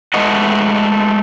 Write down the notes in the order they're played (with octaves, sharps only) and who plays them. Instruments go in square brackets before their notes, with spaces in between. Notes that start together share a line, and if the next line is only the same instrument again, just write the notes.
[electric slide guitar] G#3 A3 B4 D#5 F#5